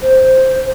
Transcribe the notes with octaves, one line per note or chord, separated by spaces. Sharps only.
C5